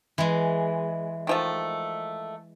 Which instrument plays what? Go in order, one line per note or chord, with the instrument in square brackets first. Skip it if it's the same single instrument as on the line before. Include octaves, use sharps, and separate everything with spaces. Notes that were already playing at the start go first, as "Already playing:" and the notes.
[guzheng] E3 G#3
[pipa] D#3 F3 A3